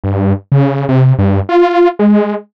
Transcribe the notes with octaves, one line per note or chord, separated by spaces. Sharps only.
G2
C#3
C3
G2
F4
G#3